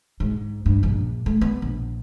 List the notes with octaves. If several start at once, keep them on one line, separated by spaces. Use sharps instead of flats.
G#2
G2
A#1
A3
B3
A#1